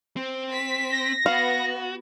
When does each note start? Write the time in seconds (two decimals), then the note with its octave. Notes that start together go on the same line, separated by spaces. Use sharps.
0.16 C4
0.54 B6
0.92 A#6
1.26 B3 F#4 F5